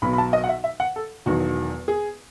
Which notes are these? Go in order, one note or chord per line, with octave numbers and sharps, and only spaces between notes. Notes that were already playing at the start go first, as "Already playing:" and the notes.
B1 B2 F#3 B5
B5
A5
D#5
F#5
E5
E5
F#5
A4
E1 E2 D#3 F#3 F#4
G#4